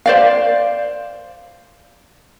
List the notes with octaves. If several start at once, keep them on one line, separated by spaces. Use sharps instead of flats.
C5 D5 F5